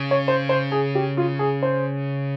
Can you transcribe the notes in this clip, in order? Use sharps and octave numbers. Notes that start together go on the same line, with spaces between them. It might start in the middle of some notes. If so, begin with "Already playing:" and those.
Already playing: C#3
C#5
C5
C5
G#4
G4
F4
G#4
C5